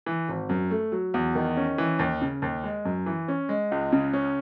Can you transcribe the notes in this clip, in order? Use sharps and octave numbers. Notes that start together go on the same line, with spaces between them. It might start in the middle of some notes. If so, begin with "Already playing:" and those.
E3
G#1
F#2
A3
F#3
E2
D#3
C#4
E3
D#2
C#3
D#2
G#3
F#2
E3
C#4
G#3
C#2
C#3
C#4